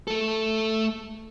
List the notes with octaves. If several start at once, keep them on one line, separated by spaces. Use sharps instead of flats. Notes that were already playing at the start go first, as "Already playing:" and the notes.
A3 A4